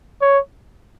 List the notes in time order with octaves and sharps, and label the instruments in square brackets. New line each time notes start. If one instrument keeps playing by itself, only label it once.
[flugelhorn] C#5